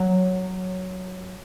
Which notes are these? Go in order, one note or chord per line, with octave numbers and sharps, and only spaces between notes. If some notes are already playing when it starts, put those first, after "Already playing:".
Already playing: F#3